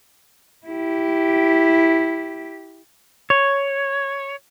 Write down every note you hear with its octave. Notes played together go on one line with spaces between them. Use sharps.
E4 G4
C#5